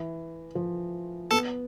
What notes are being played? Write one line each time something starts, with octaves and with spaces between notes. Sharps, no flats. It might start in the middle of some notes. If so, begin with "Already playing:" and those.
Already playing: E3
F3
B3 A4 A5